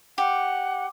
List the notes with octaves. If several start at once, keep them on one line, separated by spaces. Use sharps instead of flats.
G4 F#5